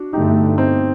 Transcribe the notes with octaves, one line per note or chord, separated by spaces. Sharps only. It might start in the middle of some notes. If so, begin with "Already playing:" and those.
Already playing: D4 F#4
G2 D3 A3 D#4 G4
C4 D#4